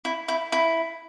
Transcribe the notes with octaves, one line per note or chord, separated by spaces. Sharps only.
E4
E4
E4